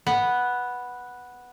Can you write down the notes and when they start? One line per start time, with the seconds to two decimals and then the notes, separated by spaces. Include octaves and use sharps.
0.07 B3